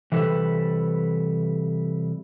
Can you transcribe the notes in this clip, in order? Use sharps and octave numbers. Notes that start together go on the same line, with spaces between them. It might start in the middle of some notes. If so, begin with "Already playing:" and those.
C3 E3 G3 A4 B4